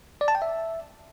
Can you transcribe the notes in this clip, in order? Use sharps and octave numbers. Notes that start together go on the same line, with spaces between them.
D5
A5
G5
E5